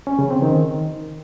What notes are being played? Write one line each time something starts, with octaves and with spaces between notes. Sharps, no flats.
C#4
C#3
C4
D#3